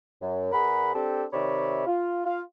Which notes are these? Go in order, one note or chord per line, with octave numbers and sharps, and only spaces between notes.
F#2
E2 G#4 A#4 F#5 B5
C4 D4 G4 A4
C3 D#3 C#5 D5 E5 B5
F4
F4 F5